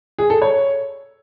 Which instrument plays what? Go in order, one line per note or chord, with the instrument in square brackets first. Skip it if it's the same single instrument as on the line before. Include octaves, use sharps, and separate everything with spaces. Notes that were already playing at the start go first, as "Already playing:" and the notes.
[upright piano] G#4
A4
C#5